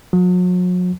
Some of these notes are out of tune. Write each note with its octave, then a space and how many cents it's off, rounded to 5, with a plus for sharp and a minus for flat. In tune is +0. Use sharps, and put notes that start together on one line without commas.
F#3 -40